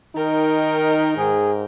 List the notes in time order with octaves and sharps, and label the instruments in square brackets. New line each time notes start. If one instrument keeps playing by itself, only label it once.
[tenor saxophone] D#3 [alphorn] D#4 [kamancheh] A#4 G5
[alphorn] G#2 [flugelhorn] G#4